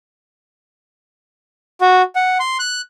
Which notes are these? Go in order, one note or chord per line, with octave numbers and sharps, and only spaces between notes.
F#4
F#5
C6
F#6